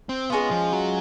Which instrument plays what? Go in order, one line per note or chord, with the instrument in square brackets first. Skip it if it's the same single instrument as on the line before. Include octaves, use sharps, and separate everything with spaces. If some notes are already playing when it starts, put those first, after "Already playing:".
[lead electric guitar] C4
[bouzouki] G#3 C#4 F4 [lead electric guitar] B3
[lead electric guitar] F3
F#3